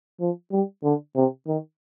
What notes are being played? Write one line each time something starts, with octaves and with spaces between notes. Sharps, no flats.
F3
G3
D3
C3
D#3